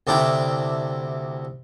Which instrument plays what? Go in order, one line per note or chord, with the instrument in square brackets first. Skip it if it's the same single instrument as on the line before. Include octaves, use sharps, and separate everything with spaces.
[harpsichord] D2 C3 D4 E4 G5